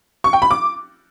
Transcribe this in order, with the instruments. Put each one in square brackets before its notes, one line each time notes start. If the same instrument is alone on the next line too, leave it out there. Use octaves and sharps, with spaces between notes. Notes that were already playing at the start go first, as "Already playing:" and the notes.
[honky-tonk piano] C#6
G5
B5
D6